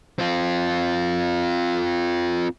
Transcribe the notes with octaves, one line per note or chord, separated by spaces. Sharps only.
C4 F4